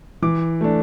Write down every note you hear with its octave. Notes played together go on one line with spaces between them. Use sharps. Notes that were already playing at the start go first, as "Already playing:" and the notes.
E3 D6
A3 D4